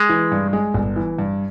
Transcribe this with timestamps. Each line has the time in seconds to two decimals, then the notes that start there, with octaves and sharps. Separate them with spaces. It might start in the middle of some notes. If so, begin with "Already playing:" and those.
Already playing: G#3
0.09 E3
0.32 G2
0.53 G#3
0.74 G1
0.96 E3
1.19 G2